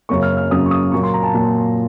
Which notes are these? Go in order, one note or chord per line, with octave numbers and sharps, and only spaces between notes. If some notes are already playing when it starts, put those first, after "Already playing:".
F#2 C#3 F#3 A#3 C#6
F6
F6
F#2 C#3 F#3 A#3 D#6
C#6
D#6
A#2 F#3 A#3 C#6
C6
A#5
A5
A#2 F#3 A#3